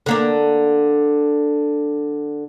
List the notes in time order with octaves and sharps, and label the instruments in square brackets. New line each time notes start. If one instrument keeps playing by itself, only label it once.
[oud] D3 A#3 D4